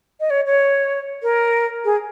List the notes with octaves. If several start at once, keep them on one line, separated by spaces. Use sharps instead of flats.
D#5
C#5
C#5
A#4
G#4